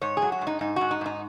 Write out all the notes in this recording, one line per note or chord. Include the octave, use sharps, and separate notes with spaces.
G#2 C#5
F#3 G#4
F#4
G#2
D#4
G#2 D#4
G#2 F#4
D#4
G#2 D#4